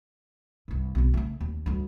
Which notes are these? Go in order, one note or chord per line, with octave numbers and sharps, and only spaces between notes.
C2 G2
B1 C#3
C#3 A3
D#2
D2 G3